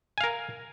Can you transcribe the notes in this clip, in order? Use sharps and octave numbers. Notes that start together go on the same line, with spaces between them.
A#4 F5 G#5